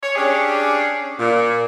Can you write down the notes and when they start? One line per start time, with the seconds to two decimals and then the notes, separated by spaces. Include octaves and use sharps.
0.03 C#5
0.16 C#4 D4 G4 G#4
1.19 A#2